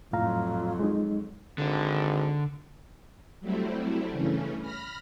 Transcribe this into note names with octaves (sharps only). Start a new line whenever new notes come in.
F2 A2 F#3 F4 F5 A#5
G#3 D#4
G#1 D3
F#3 G3 A3 C4 E4
G2 C#3 E3 A3 C#4
B5 F6 A#6